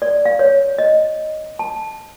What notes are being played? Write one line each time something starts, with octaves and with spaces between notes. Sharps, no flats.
D5
F5
C#5
D#5
A5